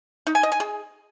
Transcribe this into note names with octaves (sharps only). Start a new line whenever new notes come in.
D#4
G#5
D#5
G#5
G#4